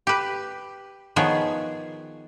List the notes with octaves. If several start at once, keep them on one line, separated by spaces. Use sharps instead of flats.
G4 B4
D#3 F3 B3 G#4 B4 C#5